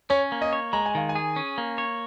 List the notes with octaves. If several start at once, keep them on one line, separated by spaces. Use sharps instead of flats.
C#4 C#5
A#3
D#5
C#5
G#3 A#5
G#5
D#3 F5
G#5
G#4
C#4
A#3
C#5